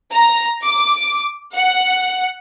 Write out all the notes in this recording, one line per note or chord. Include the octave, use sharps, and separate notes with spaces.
A#5
D6
F#5